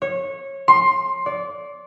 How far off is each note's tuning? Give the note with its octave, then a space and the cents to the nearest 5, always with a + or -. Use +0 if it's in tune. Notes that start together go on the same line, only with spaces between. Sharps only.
C#5 -20
C6 +15
D5 -20